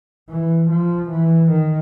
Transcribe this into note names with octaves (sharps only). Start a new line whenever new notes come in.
E3
F3
E3
D#3